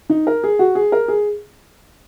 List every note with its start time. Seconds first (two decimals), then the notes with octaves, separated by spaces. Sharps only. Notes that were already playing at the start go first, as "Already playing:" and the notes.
0.10 D#4
0.27 A#4
0.44 G#4
0.59 F#4
0.75 G#4
0.92 A#4
1.08 G#4